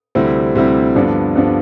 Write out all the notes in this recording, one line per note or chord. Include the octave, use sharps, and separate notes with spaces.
D2 C3 G3 C4 E4
D2 C3 G3 C4 E4
G2 D3 F3 B3 D4
G2 D3 F3 B3 D4